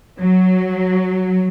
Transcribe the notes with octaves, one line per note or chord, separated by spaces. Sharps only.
F#3